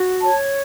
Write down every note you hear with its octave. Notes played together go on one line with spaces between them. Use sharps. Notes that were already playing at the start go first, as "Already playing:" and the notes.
Already playing: F#4
C#5 A5